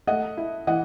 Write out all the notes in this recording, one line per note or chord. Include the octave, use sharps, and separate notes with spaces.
A3 D#5 F#5
E4
E3 D#5 F#5